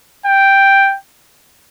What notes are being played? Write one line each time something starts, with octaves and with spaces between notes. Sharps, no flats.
G5